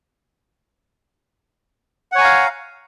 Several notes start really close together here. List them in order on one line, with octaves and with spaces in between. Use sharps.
F#5 C#5 G#5 A#5 F5